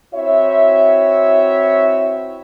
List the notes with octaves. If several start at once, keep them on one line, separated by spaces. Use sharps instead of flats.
C4 E4 F#4 C#5 E5